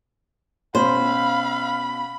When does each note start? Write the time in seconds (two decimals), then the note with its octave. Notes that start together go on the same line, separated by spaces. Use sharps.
0.75 B2 C#4 C5 F5 B5